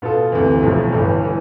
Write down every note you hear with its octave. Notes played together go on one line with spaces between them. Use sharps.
B2 B3 F4 A4
D2 C3 E3
B1 A2 F3
G1 G2 E3
E3 B3